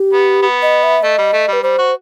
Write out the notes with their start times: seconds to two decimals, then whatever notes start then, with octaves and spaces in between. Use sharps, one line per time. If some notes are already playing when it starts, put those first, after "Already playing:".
Already playing: G4
0.13 B3
0.42 B3
0.62 D#5
0.83 E5
1.03 A3 D#5
1.18 G3
1.33 A3
1.48 G3 B4
1.63 G3 C5
1.78 F#4